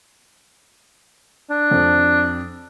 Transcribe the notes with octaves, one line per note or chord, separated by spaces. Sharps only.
D4
F2